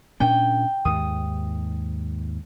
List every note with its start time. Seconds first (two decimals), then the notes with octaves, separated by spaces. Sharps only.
0.20 A#2 C#4 D4 G5
0.85 D#2 G#2 D#6